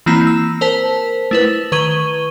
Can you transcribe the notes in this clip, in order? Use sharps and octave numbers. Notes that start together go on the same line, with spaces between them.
E3 A#3 C4 E4 A#5
E6
A#4 C5 A5 B6
A3 E4 B4
D#3 B4 C#6 G#6 D#7 G7